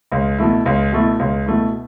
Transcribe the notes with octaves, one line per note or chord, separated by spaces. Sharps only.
C#2
B2 A3 E4
C#2
B2 A3 E4
C#2
B2 A3 E4